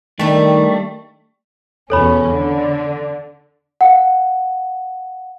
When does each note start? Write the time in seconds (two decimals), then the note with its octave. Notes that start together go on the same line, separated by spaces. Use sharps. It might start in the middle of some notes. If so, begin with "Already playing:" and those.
0.19 D#3 G3 A3 D4
1.90 E2 B2 C#4 A4 C#5 B5
2.29 D3
3.81 F5 F#5